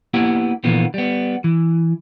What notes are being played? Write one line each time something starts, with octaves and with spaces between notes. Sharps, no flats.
A#3 B3 E4 G4 F#5
A#2 D3 E3 F3 A#3 B3
G3 B3
E3